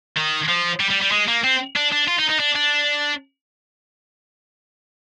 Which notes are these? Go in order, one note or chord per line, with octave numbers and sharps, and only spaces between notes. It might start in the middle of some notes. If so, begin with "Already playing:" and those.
D#3
F3
G3
G3
G3
G#3
A#3
C4
D4
D4
F4
D#4
D#4
D4
D4